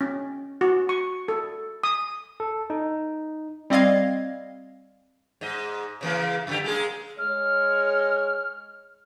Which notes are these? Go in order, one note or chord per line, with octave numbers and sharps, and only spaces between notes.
C#4
F#4
C#6
A4
D#6
A4
D#4
G3 C4 D5 D#5 F5 G#6
G#2 D#5
C#3 E3 A#3
F#2 D3 G4
G#3 A#3 G#4
G#3 C#5 F6